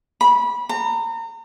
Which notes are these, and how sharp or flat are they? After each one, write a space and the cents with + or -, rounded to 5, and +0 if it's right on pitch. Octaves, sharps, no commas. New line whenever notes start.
B5 -20
A#5 -35